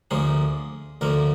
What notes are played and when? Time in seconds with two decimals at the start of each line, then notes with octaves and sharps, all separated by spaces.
0.11 D2 D3 F3 A#3 G#4
1.01 D2 D3 F3 A#3 A#4